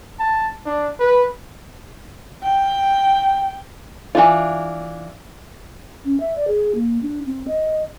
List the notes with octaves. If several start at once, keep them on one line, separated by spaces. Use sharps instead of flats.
A5
D4
B4
G5
E3 F#3 D4 F4
C#4
E5
D5
G#4
A#3
D4
C4
D#5